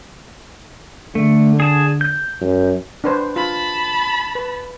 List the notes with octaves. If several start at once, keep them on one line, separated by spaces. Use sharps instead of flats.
D3 A3
G#4 A5
G6
F#2
D4 B4 C5
F4 A5 B5
B4